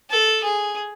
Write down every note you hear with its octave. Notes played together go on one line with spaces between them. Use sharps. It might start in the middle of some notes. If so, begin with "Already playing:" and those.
A4
G#4